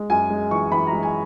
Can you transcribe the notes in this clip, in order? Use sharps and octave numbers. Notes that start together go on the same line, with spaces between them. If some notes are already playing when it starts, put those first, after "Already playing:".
Already playing: G#3
F#2 G#5
G#3
E3 C#6
E3 B5
A#5
G#3
G#5